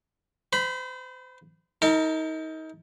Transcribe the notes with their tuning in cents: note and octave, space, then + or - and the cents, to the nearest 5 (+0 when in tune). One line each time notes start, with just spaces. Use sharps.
C5 -35 B5 +0
D#4 +30 A#4 -35 A5 -20